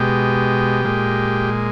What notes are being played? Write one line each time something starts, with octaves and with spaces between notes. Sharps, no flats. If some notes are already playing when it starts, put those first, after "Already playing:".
Already playing: B2 G#3 G4
A#2 G#3